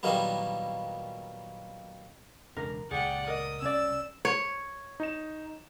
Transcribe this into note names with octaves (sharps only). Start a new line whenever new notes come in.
A#2 D#3 F#3 G3 A#3 B3
E1 C#2 D4 A#4
C#2 A#2 G#4 D5 F#5 G5
A#4 D#5 D#6
C2 C#4 D5 E6
C#5
D#4 E7